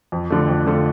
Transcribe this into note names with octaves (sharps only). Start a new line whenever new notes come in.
F2
D3 F3 A3
F2
D3 F3 A3